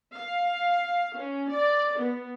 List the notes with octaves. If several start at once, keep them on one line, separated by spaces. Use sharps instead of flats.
F5
C#4
D5
B3